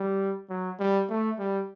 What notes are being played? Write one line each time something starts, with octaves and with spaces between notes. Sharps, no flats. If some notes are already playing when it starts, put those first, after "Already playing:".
Already playing: G3
F#3
G3
A3
G3